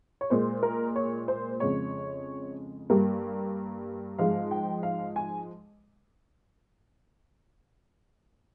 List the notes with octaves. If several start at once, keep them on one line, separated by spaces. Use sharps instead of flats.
C#5
A#2 G#3 C5
A#4
C#5
C5
F2 C#3 G#3 C#5
G2 G3 A#3
G#2 F3 G#3 F5
G5
F5
G#5